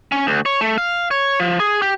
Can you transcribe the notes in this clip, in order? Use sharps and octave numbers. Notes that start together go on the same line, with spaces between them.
C#4
D2
C#5
A3
F5
C#5
F3
G#4
G4